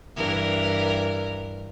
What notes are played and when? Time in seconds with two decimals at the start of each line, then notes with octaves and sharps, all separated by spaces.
0.16 G2 E3 A#4